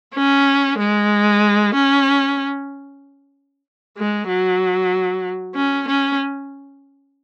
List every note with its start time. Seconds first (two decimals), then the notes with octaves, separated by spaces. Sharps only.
0.15 C#4
0.78 G#3
1.75 C#4
3.97 G#3
4.28 F#3
5.55 C#4
5.88 C#4